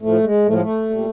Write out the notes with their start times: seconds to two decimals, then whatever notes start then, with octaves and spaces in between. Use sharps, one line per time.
0.02 A2 F3 A3
0.24 G#3
0.46 A2 A3
0.49 F3 G#3
0.61 A3
0.90 A#2 G3